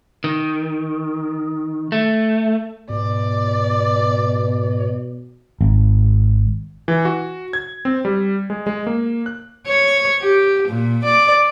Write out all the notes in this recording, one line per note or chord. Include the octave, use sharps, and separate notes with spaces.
D#3
A3
G#2 B2 D5
G#1
E3
F#4
G#6
C4
G3
G#3
G#3
A#3
F#6
C#5
G4
A#2
D5